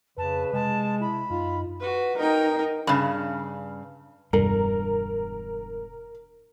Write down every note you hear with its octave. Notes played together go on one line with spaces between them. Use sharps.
F2 C#3 B4 A5
C3 G#3 A5
E4 B5
F#2 D#4 F4
F#4 B4
D#4 A#4 G5
G2 C#3
E1 G2 D3 A#4